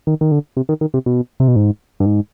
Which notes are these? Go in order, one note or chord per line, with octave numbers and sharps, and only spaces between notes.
D#3
D#3
D3
C3
D#3
D#3
C3
B2
C3
B2
G#2
G2
G#2